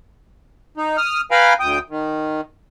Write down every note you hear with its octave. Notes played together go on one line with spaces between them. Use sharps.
D#4
D#6 F6
B4 F5 G5 G#5 A#5 B5
D2 G5 D#6
D#3